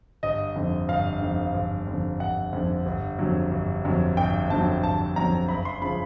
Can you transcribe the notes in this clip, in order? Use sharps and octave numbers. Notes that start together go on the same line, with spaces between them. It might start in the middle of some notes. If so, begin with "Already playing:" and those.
G1 D#5
F2 D3
G1 F5
F2 D3
G1
F2 D3
G1 F#5
F2 D3
G1
F2 D3 F#3
G1
F2 D3 F#3
G1 G5
F2 D3 F#3 A5
G1 A5
F2 D3 F#3 A#5
F#1 B5
C6
C#3 F3 B5